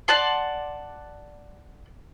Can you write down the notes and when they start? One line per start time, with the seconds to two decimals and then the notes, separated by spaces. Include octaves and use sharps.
0.08 D5 F#5 A5 C6